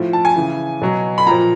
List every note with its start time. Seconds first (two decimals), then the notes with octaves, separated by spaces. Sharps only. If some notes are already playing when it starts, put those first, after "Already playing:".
Already playing: A2 F3
0.13 A5
0.25 G#5
0.36 C#3 E3
0.82 B2 F#3
1.18 B5
1.27 A#2 F3 A#5